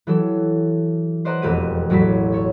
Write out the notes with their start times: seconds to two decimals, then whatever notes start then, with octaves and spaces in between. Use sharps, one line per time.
0.07 E3 F#3 G4 A4
1.25 B4 C5 D5 D#5 F#5 A#5
1.42 E1 F2 A3 G4 B5 D#7
1.90 A1 F#3 A4 D5 B5 B6
2.32 A4 C#5 C#6